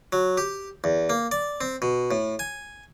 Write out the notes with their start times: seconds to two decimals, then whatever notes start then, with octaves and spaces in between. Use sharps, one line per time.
0.13 F#3
0.38 G4
0.84 E2
1.10 A#3
1.32 D5
1.61 C4
1.82 B2
2.11 A2
2.39 G#5